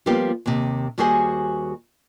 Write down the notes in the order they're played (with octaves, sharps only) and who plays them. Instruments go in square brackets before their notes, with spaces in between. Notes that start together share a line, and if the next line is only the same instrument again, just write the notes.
[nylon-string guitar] F3 G3 A#3 B3 F4 G4
D#2 C3
D#2 G3 F#4 G#4 C5 G#5